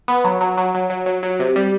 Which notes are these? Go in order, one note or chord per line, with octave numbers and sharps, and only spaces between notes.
B3
F#3
F#3
F#3
F#3
F#3
F#3
F#3
C3
G3